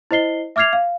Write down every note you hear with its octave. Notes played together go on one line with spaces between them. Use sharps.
E4 C5 D#5 C7 G7
E5 D6 F6 G#6 C7 F7
F5